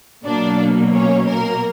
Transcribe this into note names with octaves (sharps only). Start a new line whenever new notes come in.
B2 F#3 A#3 D4 D5
C#4 C#5
A#3 A#4